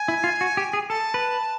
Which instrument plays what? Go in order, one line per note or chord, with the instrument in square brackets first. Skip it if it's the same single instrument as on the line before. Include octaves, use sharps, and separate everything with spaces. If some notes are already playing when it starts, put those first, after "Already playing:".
Already playing: [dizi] G#5
[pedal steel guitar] E4
F4
F#4
G4
G#4
[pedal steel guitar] A4 [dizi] A5
[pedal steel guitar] B4